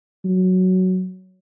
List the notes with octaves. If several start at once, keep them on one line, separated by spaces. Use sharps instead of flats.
F#3